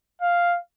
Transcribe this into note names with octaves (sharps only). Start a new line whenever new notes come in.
F5